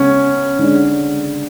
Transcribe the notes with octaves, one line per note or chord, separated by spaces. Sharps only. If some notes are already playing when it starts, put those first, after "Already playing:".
Already playing: C#3 G#3 B3 C#4
D3 G#3 D4